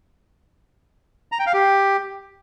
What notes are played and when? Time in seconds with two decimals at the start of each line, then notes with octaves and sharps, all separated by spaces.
1.32 A#5
1.39 G5
1.46 F5
1.54 G4